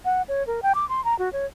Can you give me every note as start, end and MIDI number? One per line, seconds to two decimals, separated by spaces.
0.05 0.22 78
0.28 0.45 73
0.47 0.60 70
0.63 0.73 79
0.75 0.87 86
0.89 1.03 84
1.05 1.17 82
1.19 1.32 66
1.33 1.46 73